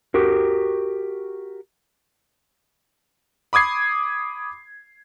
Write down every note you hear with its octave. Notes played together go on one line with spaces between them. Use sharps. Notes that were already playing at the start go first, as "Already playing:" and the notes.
F#4 G4 A#4
B5 D6 D#6 G#6 C7